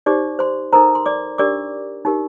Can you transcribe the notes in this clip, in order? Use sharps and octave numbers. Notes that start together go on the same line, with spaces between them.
D#4 G4 C5 D5 D6
C5 C6
D#4 A4 A#4 C5 A#5
C6
D5 D6
D4 G4 A#4 D5 D6
D#4 G4 A#4